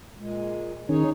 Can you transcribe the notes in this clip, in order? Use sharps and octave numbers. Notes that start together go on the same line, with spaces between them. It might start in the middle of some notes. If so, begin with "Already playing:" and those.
A#2 G#3
D#3 C#4 D#4 G#4 C#5